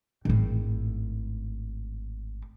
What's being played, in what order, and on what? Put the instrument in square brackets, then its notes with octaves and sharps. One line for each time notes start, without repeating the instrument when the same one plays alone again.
[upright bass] G#1 A2